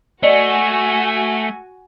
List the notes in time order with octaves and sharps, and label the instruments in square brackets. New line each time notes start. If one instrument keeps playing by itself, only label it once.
[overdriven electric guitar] A3 [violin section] F#4 G#5 [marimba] D5 D#5